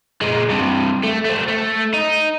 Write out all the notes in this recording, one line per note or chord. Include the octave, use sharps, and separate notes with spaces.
A#2 G#3
G2 C3
A3
A3 C4
A3
D#4